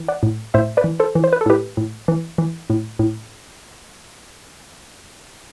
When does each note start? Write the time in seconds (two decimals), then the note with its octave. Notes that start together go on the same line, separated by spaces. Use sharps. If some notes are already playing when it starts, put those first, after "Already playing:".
Already playing: E3
0.08 D5 F#5
0.23 A2
0.54 A2 C5 E5
0.77 B4 D5
0.84 E3
1.00 A4 C5
1.15 E3
1.24 C5
1.33 B4
1.41 A4
1.46 A2 G4 B4
1.77 A2
2.08 E3
2.38 E3
2.70 A2
2.99 A2